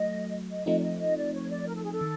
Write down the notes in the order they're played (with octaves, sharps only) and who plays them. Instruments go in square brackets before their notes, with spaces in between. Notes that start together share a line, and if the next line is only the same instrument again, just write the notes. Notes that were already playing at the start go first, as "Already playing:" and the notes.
Already playing: [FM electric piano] F#3 A3 [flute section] D#5
[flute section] D#5
[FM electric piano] F3 A3 C4 D#4 [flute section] D#5
[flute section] D5
D#5
D#5
D5
C#5
D5
A#4
A4
G#4
A4
[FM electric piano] D#3